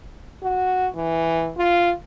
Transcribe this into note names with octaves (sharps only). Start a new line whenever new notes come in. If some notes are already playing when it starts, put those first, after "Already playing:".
F#4
E3
F4